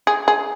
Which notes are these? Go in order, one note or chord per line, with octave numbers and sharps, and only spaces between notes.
G#4
G#4